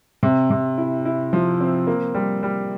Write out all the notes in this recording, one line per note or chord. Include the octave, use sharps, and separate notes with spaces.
C3
C3
E4
E4
F3
C4
A#3
G3
G3